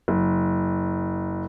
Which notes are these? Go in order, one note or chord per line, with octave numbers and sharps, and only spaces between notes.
F#1